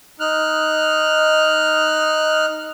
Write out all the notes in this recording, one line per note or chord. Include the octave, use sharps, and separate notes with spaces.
D#4 F6 F#6